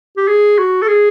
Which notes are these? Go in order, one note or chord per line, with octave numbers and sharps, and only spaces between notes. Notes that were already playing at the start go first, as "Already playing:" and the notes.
G4
G#4
F#4
A4
G#4